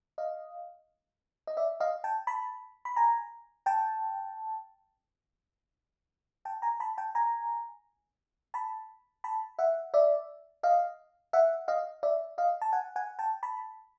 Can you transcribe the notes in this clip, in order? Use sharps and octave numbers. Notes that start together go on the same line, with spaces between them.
D#5 F5
D#5
D5 E5
D#5 F5
G5 A5
A5 B5
B5
G#5 A#5
G5 A5
G5 A5
G#5 A#5
A5 B5
G5 A5
G#5 A#5
A5 B5
A5 B5
E5 F#5
D5 E5
D#5 F5
E5 F#5
D#5 F5
D5 E5
D#5 F5
A5
F#5 G#5
F#5 G#5
G5 A5
A5 B5